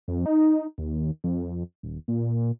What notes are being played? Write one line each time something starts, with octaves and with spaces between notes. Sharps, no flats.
F2
D#4
D#2
F2
D#1
A#2